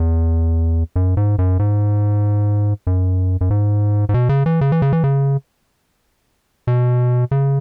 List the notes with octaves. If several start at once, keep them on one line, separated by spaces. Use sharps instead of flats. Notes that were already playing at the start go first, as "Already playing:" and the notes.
Already playing: E2
F#2
G#2
F#2
G#2
F#2
F#2
G#2
G#2
B2
C#3
E3
C#3
E3
C#3
E3
C#3
B2
C#3